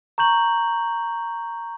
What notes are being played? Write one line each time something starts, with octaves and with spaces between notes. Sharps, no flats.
A#5 C#6 G6 F#7